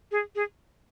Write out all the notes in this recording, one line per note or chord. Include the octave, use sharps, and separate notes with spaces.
G#4
G#4